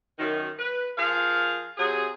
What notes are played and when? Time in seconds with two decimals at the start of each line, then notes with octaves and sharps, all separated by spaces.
0.19 F#2 D#3
0.59 B4
0.98 F3 G#4 A#4 F5
1.77 C3 F#3 G#4